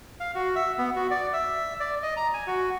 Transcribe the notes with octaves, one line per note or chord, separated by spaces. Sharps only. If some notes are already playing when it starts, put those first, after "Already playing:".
F5
F#4
E5
B3
F#4
D5
E5
D5
D#5
A#5
G#5
F#4